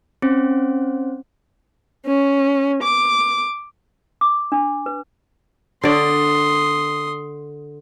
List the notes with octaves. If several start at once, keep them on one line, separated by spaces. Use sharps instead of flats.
C4 C#4 C5
C#4
D6
D6
D4
B4
D3 D5 C6 D#6